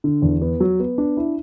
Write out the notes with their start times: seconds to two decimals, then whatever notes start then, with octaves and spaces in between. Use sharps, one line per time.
0.04 D3
0.22 E2
0.41 B3
0.60 F#3
0.80 B3
0.98 D4
1.17 E4